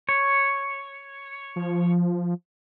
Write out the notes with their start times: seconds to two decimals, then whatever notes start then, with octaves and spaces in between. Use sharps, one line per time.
0.09 C#5
1.56 F3